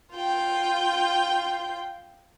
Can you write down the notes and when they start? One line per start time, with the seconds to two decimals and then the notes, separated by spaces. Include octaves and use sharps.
0.14 F4 G5